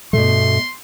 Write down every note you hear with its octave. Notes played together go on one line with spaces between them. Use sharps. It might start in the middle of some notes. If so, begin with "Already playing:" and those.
G2 B2 A3 C6